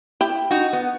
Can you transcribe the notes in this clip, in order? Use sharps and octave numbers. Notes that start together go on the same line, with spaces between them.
E4 G4
D#4 F#4
B3